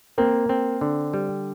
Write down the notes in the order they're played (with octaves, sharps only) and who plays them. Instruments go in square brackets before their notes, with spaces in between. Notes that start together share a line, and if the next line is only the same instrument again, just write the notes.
[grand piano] A#3 [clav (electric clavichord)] C4
[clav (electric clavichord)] C4
D3
G3